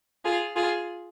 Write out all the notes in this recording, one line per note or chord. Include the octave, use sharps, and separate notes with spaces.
F4 G#4
F4 G#4